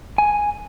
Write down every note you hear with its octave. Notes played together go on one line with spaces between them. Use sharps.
G#5